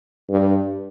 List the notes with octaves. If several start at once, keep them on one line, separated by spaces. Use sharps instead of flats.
G2